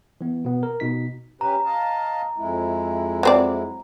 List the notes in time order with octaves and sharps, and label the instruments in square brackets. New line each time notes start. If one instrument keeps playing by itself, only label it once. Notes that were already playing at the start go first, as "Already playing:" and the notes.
[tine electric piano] E3 B3
B2 B3
A#4
B2 D#4 B6
[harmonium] C#4 G4 B4 [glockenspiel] A#5
[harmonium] D#5 F5 A5
F2 G#3 E4
[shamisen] F#3 C4 D5